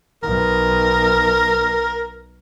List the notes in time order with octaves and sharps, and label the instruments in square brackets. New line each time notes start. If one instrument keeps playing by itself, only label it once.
[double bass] B1 [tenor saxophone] A#4